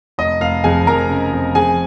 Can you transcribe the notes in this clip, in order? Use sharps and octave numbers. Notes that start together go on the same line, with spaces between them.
F1 D#5
F1 F5
F2 G#4 G#5
F2 A#4 A#5
C#3
F2
F2 G#4 G#5